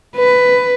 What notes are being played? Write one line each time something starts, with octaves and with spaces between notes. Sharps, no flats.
B4